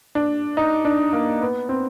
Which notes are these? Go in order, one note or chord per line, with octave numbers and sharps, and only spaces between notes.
D4
D#4
D4
A#3
B3
C4